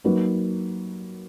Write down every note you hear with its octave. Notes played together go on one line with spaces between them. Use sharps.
F#3 A#3 D#4 F#4 B4